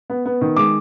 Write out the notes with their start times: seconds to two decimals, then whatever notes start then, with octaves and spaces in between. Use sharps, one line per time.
0.10 B3
0.26 B3
0.41 D#3
0.56 G#3 D6